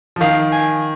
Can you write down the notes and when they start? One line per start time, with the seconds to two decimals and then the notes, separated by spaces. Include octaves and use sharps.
0.16 F3
0.21 D#3 F5
0.52 G#5